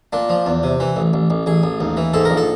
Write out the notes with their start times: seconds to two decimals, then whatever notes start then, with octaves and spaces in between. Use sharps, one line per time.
0.13 A#2 D4
0.29 F3
0.46 E2
0.63 C3
0.80 E3
0.96 A1
1.13 A1
1.30 A1
1.46 A1 G#4
1.63 A1
1.80 D#2
1.97 E3
2.13 G#2 A4
2.25 A#1 A#4
2.37 A4